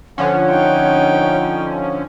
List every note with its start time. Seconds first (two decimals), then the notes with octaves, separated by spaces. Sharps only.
0.18 D3 F3 C#4 C#5 F#5
0.50 D#4 G5